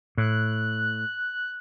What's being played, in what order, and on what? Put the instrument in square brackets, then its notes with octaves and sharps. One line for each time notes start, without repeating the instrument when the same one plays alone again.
[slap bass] A2 [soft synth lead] F#6